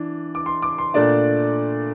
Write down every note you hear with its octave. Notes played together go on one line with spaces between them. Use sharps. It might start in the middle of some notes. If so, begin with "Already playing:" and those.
Already playing: E3 D4
D6
C6
D6
C6
A#2 A3 D4 D5